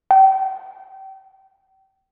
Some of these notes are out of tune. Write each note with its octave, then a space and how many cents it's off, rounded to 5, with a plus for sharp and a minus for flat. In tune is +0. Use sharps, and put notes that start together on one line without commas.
G5 -30